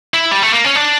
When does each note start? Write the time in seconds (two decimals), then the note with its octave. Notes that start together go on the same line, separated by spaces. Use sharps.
0.14 E4
0.31 G3
0.42 A3
0.53 A#3
0.65 C#4
0.76 D4